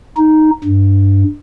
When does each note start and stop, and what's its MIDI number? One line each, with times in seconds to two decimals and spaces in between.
0.17 0.51 63
0.64 1.24 43